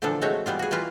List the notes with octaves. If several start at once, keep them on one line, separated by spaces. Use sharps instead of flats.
A#2 D3 E3 F3 D4 A4
G#3 A3 C4 F#4 C#5 E5
E3 G3 B3 F4
F#4 G#4
E3 G3 A#3 F4 B4